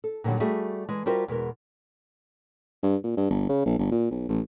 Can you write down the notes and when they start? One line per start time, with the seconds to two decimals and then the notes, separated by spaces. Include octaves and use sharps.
0.04 A4
0.24 A#2 D3 D#3 F#3 G3
0.40 G3 A3 F#4 G#4 E5
0.89 E3 G#3
1.06 G3 F4 F#4 A#4 C5 E5
1.28 E2 B2 G#3 A#4
2.83 G2
3.04 A#2
3.17 G2
3.30 G1
3.49 C#3
3.66 A#1
3.79 G1
3.91 A#2
4.11 B1
4.29 A1